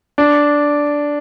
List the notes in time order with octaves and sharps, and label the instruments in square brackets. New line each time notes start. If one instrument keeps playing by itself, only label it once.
[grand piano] D4